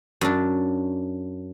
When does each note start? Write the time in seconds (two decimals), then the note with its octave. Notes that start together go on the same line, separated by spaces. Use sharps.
0.21 F#2 D4